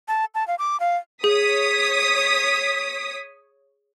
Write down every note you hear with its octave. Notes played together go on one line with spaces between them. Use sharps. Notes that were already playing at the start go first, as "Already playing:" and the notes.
A5
A5
F5
D6
F5
G#4 C#5 D#6 B6